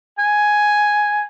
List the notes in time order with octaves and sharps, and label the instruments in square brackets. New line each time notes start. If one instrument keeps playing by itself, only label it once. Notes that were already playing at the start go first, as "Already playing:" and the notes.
[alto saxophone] G#5